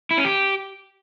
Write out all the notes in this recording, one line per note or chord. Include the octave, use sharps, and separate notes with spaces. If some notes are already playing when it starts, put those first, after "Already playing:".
E4
C#4
G4